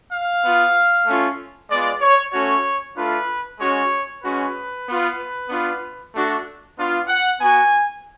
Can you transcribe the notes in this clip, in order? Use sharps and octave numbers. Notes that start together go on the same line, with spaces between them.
F5
B3 F4
A3 C#4 F4
G#3 B3 F4 D5
C#5
A3 C#4 F#4 C#5
A3 D4 F4 B4
G#3 C#4 F#4 C#5
G#3 C#4 F#4 B4
B3 F4
B3 D4 F4
A3 D4 F#4
B3 D4 F4
F#5
B3 F#4 G#5